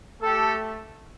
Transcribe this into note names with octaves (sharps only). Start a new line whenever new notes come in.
A3 G4 A4